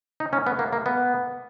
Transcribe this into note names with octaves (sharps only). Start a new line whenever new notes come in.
D#4
C#4
B3
A#3
A#3
B3